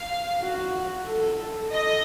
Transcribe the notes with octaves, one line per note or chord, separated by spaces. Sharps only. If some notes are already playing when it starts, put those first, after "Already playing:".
Already playing: F5
F#4
A4
A4 D#5